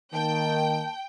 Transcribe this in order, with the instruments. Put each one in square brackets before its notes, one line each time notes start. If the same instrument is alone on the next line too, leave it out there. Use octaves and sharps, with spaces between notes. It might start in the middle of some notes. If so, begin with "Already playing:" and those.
[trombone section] D#3 [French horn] A#3 [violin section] G5 [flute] A5